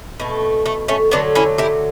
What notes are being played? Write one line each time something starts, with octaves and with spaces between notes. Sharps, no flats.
B2 A3
A3
A3 C#4
D3 F#3 A3 B3 D4
C#4 E4
E4 G4